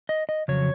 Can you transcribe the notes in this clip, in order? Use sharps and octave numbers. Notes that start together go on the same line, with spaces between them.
D#5
D#5
F2 C#3 F#3 C#5